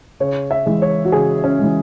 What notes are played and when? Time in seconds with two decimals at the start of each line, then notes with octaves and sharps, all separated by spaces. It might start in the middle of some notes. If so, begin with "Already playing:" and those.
0.20 C#3 C#5
0.51 E5
0.66 E3 G#3
0.82 C#5
1.05 F#4
1.12 C#3 G#4
1.44 C#4
1.59 E3 G#3